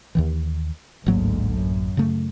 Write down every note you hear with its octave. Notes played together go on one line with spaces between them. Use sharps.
D#2 D#3 E3
A1 D2 G#2 F#3 A#3
F#2
C#3 A3